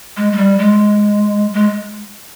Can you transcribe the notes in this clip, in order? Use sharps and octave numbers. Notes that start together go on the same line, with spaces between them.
G#3
G#3
G3
G#3
G#3